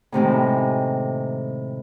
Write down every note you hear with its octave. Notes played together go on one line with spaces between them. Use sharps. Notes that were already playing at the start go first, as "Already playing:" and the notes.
A2 C3 D#3 G#3